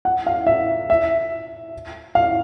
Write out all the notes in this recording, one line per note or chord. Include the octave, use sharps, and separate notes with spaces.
F#5
F5
E5
E5
F5